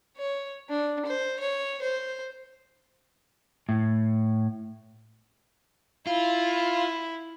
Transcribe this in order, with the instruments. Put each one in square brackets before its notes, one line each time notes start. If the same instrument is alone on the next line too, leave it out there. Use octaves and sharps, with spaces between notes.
[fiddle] C#5
D4
C5
C#5
C5
[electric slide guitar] A2
[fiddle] E4 [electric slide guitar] F4